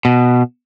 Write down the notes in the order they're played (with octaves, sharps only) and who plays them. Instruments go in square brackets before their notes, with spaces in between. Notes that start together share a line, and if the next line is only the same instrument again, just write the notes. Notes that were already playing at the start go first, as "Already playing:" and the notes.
[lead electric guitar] B2